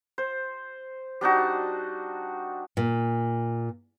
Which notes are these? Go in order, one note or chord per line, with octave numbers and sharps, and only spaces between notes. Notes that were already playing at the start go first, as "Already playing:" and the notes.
C5
G3 D4 D#4 F#4
A#2